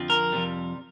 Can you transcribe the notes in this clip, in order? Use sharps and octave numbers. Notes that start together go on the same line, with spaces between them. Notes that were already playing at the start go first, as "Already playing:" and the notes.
Already playing: F2 D3 F3 C4
A#4
F2 C3 G3